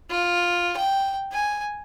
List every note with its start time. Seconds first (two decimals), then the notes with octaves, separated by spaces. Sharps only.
0.10 F4
0.77 G5
1.32 G#5